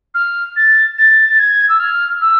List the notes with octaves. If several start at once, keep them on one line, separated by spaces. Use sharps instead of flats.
F6
A6
A6
A6
G#6
E6
F6
E6